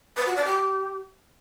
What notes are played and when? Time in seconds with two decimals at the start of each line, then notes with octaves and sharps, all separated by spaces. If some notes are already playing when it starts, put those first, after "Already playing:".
0.17 B4
0.26 F#4
0.36 D5
0.45 G4